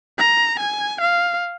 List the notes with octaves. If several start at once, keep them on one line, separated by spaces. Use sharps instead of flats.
A#5
G#5
F5